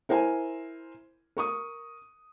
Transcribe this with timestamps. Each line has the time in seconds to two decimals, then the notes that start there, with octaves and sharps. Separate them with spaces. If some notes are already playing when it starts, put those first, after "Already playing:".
0.09 E4 A#4 C5 G#5
1.37 A#4 C#6 D#6